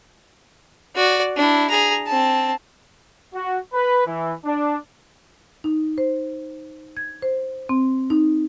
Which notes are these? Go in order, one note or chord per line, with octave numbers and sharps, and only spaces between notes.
F#4 D5
D4 E4
G#4 A#5
C4 A5
F#4
B4
E3
D4
D#4
C5
G#6
C5
C4
D#4